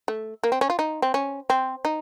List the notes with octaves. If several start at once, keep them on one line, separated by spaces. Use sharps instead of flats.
A3
A#3
C4
C#4
F4
D#4
C4
C#4
C4
D#4